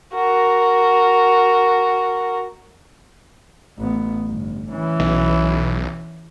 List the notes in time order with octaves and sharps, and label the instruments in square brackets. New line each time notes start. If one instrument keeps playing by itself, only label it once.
[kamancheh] F#4 A#4
[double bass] A1 B3
G1
E3 C#4
[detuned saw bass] B1